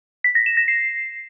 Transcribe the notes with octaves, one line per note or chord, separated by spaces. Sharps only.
B6
A#6
E7
A#6
C7